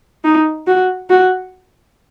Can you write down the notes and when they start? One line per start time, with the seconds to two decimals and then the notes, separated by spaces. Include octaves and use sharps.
0.24 D#4
0.67 F#4
1.10 F#4